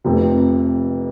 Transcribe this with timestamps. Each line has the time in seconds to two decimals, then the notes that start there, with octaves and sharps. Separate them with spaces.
0.04 F1 F2 C3